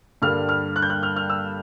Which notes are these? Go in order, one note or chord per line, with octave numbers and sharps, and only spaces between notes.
G2 D3 G3 A#3 F6
F6
F#6
G6
F#6
F6
F6
E6